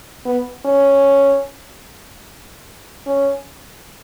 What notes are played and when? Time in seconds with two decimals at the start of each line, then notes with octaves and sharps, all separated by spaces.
0.25 B3
0.65 C#4
3.06 C#4